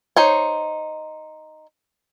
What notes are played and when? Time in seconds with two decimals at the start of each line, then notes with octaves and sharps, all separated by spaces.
0.17 D#4 C5 C#5